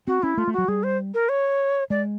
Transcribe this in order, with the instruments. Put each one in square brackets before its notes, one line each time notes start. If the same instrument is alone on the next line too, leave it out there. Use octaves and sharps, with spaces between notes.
[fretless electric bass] C4 [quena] F#4
[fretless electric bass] C#4 [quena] E4
[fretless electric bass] A3 [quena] F4
[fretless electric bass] A3
[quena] F#4
[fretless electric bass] F#3
[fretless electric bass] G3 [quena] G#4
[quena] C5
A#4
C#5
[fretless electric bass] G#3 [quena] D5